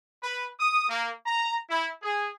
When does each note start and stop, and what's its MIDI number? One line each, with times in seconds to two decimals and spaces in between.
0.23 0.47 71
0.60 0.88 87
0.89 1.11 58
1.26 1.56 82
1.70 1.89 64
2.02 2.30 68